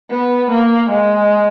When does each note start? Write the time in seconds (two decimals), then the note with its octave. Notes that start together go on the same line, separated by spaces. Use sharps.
0.11 B3
0.50 A#3
0.90 G#3